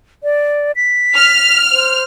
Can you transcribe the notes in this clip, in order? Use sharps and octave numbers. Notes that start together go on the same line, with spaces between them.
D5
B6
F6
C5